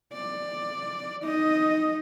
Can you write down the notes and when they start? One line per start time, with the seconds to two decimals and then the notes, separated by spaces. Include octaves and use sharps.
0.13 D5
1.23 D#4 D#5